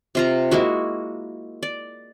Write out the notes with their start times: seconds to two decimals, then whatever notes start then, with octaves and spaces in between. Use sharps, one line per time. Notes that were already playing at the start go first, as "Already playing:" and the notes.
0.15 C3 F4 A#5
0.51 G#3 A#3 E4 F#4
1.63 D5